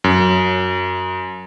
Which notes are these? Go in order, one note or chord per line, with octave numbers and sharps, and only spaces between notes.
F#2